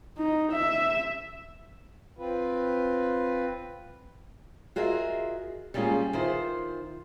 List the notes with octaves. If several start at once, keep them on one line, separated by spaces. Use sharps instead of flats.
D#4
E5
C4 F4 B4
F4 F#4 G#4 A#4 D#5 E5
G3 G#3 A#3 C#4 F4 G#4
D#3 E4 F4 C5